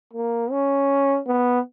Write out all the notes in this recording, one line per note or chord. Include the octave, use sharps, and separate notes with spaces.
A#3
C#4
B3